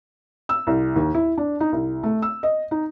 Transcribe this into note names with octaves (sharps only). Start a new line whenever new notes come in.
E6
C2
D#2
E4
D4
D#4
C2
A3
E6
D#5
D#4